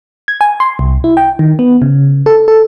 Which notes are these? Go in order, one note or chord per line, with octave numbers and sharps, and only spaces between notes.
G#6
G#5
C6
C2
E4
G5
D#3
B3
C#3
A4
A4